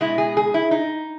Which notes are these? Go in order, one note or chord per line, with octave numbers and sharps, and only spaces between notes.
B2 G#3 E4
G#4
G#4
E4
D#4